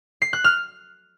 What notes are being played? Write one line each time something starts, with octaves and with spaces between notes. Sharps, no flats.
C7
F#6
F6